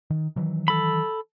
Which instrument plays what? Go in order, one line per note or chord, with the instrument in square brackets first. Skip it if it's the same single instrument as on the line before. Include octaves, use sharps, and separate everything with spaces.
[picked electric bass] D#3
D#3 E3 F#3
[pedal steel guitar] A4 B5